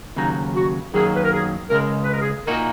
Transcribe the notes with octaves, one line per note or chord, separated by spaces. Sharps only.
D#2 C#3 F#3 D#4
F#4
F#2 D#3 F#3 A#3 G#4
B4
A#4
G#4
C#2 C#3 G#3 A#4
B4
A#4
G#4
A#2 A#3 D#4 F#4 A#4